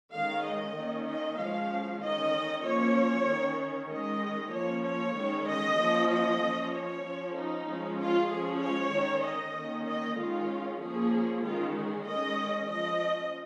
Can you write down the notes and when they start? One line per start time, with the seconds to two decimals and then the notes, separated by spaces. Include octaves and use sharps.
0.12 D#3 G#3 C#4 F5
0.44 D#5
0.76 D#3 A#3 C#4
1.07 D#5
1.38 F3 G#3 C#4 F5
2.01 D#3 C#4 D#5
2.64 F3 A#3 C#4 C#5
3.27 D#3 C#4
3.90 D#3 G#3 C#4 D#5
4.52 F3 A#3 C#4 C#5
4.84 C#5
5.16 D#3 G#3 C#4
5.47 D#5
5.78 F3 A#3 C#4
6.10 D#5
6.41 F3 C#4
6.72 C#5
7.04 F3 C#4
7.36 D#4
7.67 F3 G#3 C#4
7.99 F4
8.30 F3 G#3 C#4 G#4
8.62 C#5
8.93 D#3 C#4
9.24 D#5
9.55 D#3 A#3 C#4
9.86 D#5
10.18 D#3 G#3 C#4 F4
10.81 F3 A#3 C#4 G#4
11.44 D#3 G#3 C#4 F4
11.75 G#4
12.06 D#3 G#3 C#4 D#5
12.69 F3 C#4 D#5